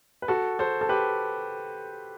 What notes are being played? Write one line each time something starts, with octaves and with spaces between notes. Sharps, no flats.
B4
F#4 A4
A4 C5
A4
G4 B4